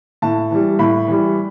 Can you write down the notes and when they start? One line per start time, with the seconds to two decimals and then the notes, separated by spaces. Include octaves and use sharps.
0.22 A2 A5
0.51 E3 G3
0.79 A2 B5
1.08 E3 G3